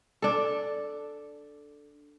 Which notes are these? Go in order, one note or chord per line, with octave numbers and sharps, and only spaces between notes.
D4 A4